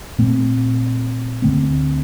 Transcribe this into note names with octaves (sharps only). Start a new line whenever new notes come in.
A#2 A3 C4
D2 D3 A3 C4